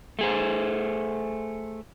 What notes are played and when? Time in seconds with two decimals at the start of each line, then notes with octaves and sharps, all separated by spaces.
0.19 A3 G#4 C5